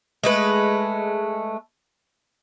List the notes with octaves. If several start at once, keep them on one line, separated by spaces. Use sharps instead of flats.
G#3 A3 B4